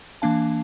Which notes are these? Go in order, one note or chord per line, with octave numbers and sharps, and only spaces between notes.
E3 A#3 D4 F5 A5